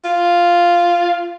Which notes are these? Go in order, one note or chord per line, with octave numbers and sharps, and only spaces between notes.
F4